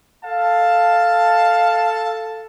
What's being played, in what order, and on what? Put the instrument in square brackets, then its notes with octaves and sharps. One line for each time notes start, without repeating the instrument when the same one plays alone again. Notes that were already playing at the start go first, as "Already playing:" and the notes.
[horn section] A4 A5 [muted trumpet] F5